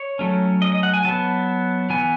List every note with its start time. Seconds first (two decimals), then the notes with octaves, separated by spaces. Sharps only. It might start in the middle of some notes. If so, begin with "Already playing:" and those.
Already playing: C#5
0.19 F#3 A3 C#4
0.62 D#5
0.72 D#5
0.83 F#5
0.94 G#5
1.04 F#3 B3 A5
1.90 E3 B3 G#5